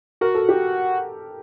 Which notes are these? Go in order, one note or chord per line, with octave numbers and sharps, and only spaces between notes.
F#4 A#4
A4
G4